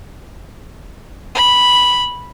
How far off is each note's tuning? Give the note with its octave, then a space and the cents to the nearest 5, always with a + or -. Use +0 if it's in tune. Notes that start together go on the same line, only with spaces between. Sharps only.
B5 -5